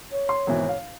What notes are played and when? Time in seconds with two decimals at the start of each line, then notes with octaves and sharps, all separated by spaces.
0.11 C#5
0.29 C6
0.47 G#1 B2 E3
0.69 F5